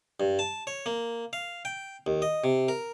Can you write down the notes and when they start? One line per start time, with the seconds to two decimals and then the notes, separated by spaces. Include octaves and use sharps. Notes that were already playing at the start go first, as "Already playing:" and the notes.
0.20 G2
0.39 A5
0.67 C#5
0.86 A#3
1.33 F5
1.65 G5
2.07 D#2
2.22 D#5
2.44 C3
2.68 A#4